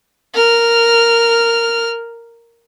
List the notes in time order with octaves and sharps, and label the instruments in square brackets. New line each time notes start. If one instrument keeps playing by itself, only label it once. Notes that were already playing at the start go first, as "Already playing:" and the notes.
[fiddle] A#4 F6